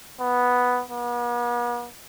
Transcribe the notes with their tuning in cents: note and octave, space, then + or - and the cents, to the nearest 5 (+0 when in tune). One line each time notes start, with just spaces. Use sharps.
B3 +0
B3 -45